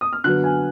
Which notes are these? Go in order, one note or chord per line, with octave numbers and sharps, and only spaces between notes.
D#6
F6
D3 F#3 B3 F#6
G#5